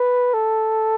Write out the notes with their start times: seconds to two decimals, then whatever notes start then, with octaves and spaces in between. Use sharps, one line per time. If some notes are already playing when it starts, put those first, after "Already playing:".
Already playing: B4
0.34 A4